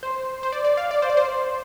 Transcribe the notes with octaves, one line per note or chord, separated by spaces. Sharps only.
C5
C5
D5
D5
F5
D5
C5
D5
C5